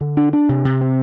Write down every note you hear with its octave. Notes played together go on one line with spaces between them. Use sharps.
D3
D4
D4
C3
C3
C4